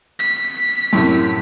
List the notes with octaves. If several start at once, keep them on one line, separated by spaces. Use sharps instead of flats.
B6
F#2 A2 C3